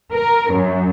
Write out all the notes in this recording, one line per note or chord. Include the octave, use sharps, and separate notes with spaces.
A#4
F#2